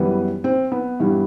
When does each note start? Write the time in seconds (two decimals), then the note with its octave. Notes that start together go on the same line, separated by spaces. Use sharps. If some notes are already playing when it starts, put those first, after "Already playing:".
Already playing: F#2 E3 G3 B3 B4
0.44 C4 C5
0.72 B3 B4
1.00 G2 E3 G3